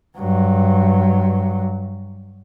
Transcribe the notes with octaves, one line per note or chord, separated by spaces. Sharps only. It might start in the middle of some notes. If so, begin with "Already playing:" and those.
G2 F#3